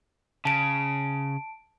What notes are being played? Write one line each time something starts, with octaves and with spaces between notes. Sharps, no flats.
C#3 A5 D7